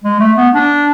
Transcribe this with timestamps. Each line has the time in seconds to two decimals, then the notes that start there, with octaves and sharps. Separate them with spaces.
0.04 G#3
0.20 A3
0.37 B3
0.54 D4